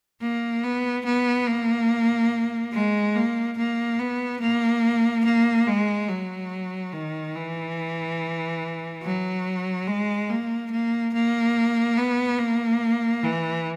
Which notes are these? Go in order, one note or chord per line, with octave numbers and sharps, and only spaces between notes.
A#3
B3
B3
A#3
G#3
A#3
A#3
B3
A#3
A#3
G#3
F#3
D#3
E3
F#3
G#3
A#3
A#3
A#3
B3
A#3
E3